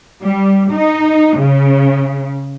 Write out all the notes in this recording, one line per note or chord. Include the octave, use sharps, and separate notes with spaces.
G3
D#4
C#3